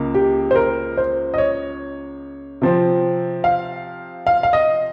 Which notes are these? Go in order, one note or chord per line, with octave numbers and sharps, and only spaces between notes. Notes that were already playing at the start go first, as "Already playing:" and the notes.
Already playing: C#2 A#3
G4
C5
A#4
C5
D#5
C#5
C3 F3 C4
F5
F5
F5
D#5